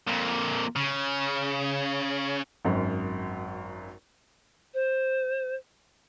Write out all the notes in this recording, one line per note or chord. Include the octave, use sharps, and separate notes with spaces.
F2 A#2
C#3
G#1 F#2
C5